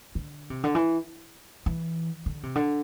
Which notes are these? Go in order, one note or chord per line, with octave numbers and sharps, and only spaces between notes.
D3
C3
D3
E3
E3
D3
C3
D3